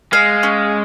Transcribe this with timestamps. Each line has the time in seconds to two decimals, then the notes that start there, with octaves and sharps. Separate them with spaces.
0.13 G#3 F5
0.43 C#4